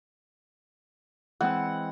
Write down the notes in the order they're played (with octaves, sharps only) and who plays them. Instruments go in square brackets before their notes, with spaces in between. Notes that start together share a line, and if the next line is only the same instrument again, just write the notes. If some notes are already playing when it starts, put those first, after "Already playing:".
[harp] E3 G#3 C4 [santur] F#5